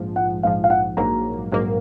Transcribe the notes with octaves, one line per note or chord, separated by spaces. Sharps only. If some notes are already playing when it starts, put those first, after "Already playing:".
Already playing: A#1 G#2 F3
F#5
A#1 G#2 F3 F5
F5
F#5
A#1 G#2 F#3 A#3 A#5
A#1 G#2 F#3 A#3